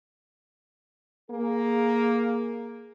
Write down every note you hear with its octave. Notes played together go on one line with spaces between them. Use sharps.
A#3 G#4